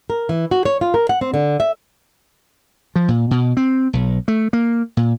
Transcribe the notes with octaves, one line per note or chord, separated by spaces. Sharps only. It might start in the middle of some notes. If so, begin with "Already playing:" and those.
A#4
E3
F#4
C#5
F4
A#4
F#5
C4
D3
E5
F3
A#2
B2
C4
B1
A3
A#3
A#2